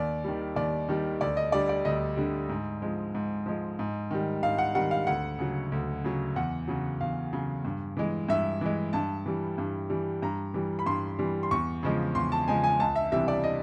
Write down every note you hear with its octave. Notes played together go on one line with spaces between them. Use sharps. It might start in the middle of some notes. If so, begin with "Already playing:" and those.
Already playing: D#2 D5
D#3 G3
D#2 D5
D#3 G3
D2 D5
D#5
D3 G3 D5
D5
D2 D#5
D3 G3
G#2
F3 G#3
G#2
F3 G#3
G#2
D#3 G3
G#2 F5
F#5
D#3 G3 F#5
F5
D2 F#5
C#3 F#3
D2
C#3 F#3
E2 F#5
C#3 F#3
E2 F5
C#3 F#3
G2
E3 G#3
G2 E5
E3 G#3
G2 A5
E3 G3
G2
E3 G3
G2 A#5
E3 G3
B5
G2 C6
E3 G3
C6
E2 C#6
C#3 F3 G#3
E2 C6
A5
C#3 F3 G#3 G#5
G#5
C#2 A5
E5
C3 E3 G3 E5
D5
D#5